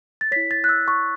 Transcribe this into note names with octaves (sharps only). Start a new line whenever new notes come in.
A6
E4 C#5 B6
A6
F#6
E6
C#6